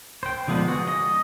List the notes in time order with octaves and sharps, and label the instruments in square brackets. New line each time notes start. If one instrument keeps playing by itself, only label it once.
[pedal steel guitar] C5 G5
D3 F3 G#3 B3 D4
F#4 G#4
D#5